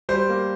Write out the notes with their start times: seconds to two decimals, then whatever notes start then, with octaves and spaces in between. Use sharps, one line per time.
0.09 G3 C5
0.29 A#3